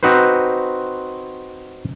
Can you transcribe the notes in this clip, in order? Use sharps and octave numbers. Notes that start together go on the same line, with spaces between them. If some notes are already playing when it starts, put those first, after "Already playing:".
C4 D#4 F#4 B4 C5